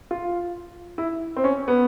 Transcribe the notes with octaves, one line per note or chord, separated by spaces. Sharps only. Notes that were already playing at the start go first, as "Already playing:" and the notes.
F4
E4
C4
C#4
B3